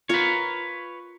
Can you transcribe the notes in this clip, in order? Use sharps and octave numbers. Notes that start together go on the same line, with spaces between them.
F4 A#4 B4 C#5